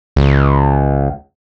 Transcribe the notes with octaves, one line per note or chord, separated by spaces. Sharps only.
C#2